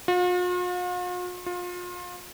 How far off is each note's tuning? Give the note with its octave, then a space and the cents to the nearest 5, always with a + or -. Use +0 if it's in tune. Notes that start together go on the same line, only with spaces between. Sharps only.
F4 +45
F4 +30